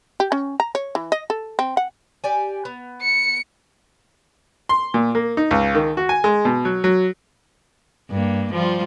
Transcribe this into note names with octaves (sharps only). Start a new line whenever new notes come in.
G4
C#4
A#5
C#5
E3
D#5
A4
C4
F#5
G4 D5 G#5
B3
C#7
C6
A#2
A#3
D#4
C#2
D#3
F#4
G#5
G#3
B2
F#3
F#3
G2 A#3
F3 G3 F4